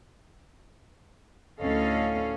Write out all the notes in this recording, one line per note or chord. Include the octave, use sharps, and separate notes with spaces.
D2 A2 C#4 A4 D#5 F5